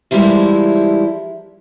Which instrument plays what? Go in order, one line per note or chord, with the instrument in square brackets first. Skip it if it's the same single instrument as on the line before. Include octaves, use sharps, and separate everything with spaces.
[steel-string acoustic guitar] E3 F3 G3 G#3 A#3 E4